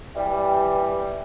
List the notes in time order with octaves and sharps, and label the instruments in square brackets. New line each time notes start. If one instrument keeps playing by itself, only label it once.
[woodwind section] E3 G3